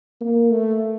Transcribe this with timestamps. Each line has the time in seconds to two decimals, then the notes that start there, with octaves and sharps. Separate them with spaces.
0.21 A#3
0.51 A3